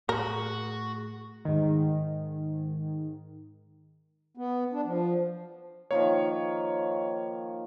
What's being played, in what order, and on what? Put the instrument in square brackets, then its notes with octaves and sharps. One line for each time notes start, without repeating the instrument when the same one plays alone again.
[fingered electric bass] A2 A3 [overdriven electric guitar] F#4 [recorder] G#4 [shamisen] A#4
[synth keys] G#2 D#3
[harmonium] B3
D4
F3
[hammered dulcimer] D#3 F3 A#3 [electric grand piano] C#5